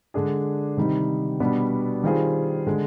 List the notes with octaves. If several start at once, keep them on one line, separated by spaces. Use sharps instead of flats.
D3 G#3 D4 G#4
C3 D#3 G3 C4 D#4
B2 G3 B3 D4
D#3 G3 C4 F4 G#4
D3 G#3